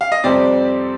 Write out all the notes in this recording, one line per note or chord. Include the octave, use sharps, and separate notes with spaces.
F5
D#5
F2 C3 G3 C4 D5